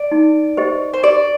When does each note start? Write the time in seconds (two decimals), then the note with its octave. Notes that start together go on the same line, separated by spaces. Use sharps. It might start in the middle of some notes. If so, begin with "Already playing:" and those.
Already playing: D5
0.12 D#4
0.57 G4 C5 D#5
0.94 C5
1.03 G4 D5